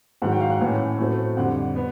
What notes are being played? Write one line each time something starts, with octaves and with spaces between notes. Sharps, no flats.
G#2 D#3 F#3 F#5
G5
F5
F#5
A2 E3 A3 C#4
A2 F#3 A3 C4
F2 D3 G3 F#5
B3